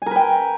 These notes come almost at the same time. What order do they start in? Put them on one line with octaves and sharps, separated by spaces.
G#5 A#4 B4 G5